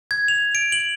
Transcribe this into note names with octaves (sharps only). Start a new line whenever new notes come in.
G#6
F7
D7
F#7